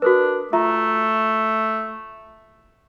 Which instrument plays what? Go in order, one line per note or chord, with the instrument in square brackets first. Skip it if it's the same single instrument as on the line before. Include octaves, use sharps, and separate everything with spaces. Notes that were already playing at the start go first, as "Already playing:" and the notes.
[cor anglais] D4 [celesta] F#4 A#4 B4
[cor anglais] A3 [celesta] F4 E5 A#5